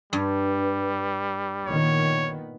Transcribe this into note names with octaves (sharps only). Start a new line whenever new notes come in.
G2 G3
A#2 D#3 B3 C#5